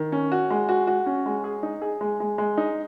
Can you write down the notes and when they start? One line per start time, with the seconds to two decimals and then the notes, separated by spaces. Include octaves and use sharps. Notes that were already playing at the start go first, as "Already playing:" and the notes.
Already playing: D#3
0.12 C#4
0.32 F#4
0.50 G#3
0.69 F#4
0.87 F#4
1.06 C#4
1.26 G#3
1.44 G#4
1.63 D#4
1.82 G#4
2.01 G#3
2.20 G#3
2.38 G#3
2.57 D#4